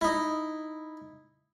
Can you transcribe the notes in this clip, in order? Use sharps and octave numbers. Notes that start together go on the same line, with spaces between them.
D#4 E4